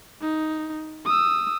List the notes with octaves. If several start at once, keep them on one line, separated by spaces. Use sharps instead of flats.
D#4
D#6 E6